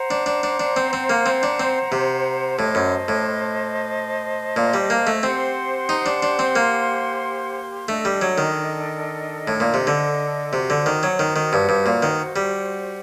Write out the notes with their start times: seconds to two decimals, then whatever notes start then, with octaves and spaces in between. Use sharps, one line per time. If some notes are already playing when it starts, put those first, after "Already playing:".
Already playing: C5 F#5 A#5
0.11 D4
0.26 D4
0.43 D4
0.60 D4
0.76 C4
0.93 C4
1.10 A#3
1.26 C4
1.43 D4
1.60 C4
1.92 C3
2.58 A2 C5 D#5 A5
2.75 F#2
3.08 A2
4.56 A#2
4.74 G3
4.90 A#3
5.07 A3
5.23 C4 G4 C5 F#5 C6
5.89 D#4
6.06 D4
6.23 D4
6.39 C4
6.56 A#3
7.88 A3 D4 A4 D#5
8.05 G3
8.21 F#3
8.38 D#3
9.48 A2
9.60 A#2
9.74 C3
9.87 D3
10.53 C3 F#4 C5 F#5
10.70 D3
10.86 D#3
11.03 F#3
11.19 D#3
11.36 D#3
11.53 G2
11.69 G2
11.86 A#2
12.03 D#3
12.36 G3